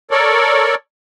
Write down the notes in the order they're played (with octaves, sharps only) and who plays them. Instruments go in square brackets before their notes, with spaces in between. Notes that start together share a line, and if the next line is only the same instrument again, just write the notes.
[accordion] A4 A#4 C#5 D5